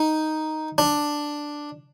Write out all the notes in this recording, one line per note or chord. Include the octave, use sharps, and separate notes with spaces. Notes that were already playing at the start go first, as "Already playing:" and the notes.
Already playing: D#4
D4